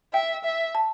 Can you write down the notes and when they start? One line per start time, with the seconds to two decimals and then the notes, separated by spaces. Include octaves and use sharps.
0.13 E5 G5
0.44 E5
0.75 A5